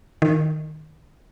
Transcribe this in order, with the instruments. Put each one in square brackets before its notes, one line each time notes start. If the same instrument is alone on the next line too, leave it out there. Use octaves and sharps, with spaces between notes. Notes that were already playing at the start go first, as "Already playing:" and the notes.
[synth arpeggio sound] D#3